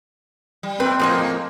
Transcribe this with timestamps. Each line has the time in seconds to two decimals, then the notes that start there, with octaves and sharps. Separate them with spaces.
0.63 G3
0.80 A#2 C4 B4
0.99 F2 A2 C#3 F3 G#3 A#3